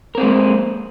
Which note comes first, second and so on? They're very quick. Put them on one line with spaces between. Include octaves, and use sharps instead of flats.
A#4 C4 G#4 G#3 A#3